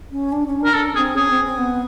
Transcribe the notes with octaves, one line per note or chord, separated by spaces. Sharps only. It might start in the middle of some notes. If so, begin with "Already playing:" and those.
C#4
D4
C#4
D4 A#4
D4 A4
C4 G#4
C#4 G#4
C4
C4
B3